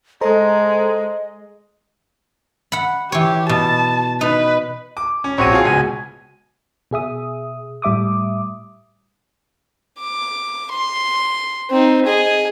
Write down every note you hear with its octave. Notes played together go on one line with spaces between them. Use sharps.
G#3 A4 C5 D#5 A#5
F#5 B5
E3 G4 C#5
B2 A5
D#4 B4
D6
C#4
A#1 C4 F#4 C#5 D#7
F4 G#4
C#2 B2 G#5
B2 G#4 E5 D#6
A2 G3 E5 D6 D#6
D6
C6
C4 D#4
G#4 D#5